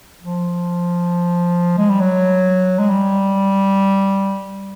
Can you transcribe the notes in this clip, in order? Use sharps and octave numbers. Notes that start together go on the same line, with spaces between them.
F3
G#3
G3
F#3
G#3
G3